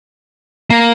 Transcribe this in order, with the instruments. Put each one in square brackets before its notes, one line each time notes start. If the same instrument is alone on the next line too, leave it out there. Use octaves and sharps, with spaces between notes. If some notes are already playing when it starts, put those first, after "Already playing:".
[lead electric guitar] A#3